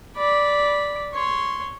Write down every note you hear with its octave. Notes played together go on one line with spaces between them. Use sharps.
D5 B5
C#5 C6